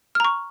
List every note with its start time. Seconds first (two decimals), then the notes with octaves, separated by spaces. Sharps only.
0.15 F6
0.20 A#5
0.25 C#6